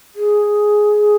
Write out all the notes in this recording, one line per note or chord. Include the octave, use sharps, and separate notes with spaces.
G#4